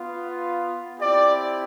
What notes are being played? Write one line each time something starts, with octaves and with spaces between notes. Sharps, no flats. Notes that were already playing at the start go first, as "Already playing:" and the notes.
Already playing: B3 F4
C4 E4 G4 D5